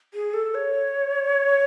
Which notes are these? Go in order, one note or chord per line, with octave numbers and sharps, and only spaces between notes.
G#4
A4
C#5